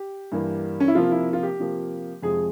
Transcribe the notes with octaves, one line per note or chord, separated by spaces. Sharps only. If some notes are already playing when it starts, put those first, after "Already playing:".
Already playing: G4
G2 E3 A#3
C#4
E4
C3 F3 A#3 F4
E4
F4
G4
C3 F3 A#3
F2 C3 F3 G#3 G#4